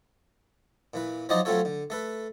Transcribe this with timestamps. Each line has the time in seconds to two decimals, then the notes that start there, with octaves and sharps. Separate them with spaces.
0.94 A#2 E3 B4
1.29 F3 F#3 D#4 C5 D5 D#5
1.45 F#3 A3 C4 F4 A4 C#5
1.65 D3
1.90 A3 A4 B4